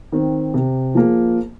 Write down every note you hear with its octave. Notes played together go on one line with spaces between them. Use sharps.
D#3 C4
C3
F3 A#3 G#4